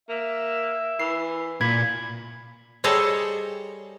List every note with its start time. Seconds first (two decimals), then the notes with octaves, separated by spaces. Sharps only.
0.09 A#3 E5
1.00 E3 C7
1.61 A#2 B5 G#6
2.84 G3 G#4 A4 C5 C#5 D#5